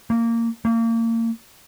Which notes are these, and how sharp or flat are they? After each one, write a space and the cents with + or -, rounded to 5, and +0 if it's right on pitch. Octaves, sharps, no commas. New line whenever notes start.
A#3 -15
A#3 -30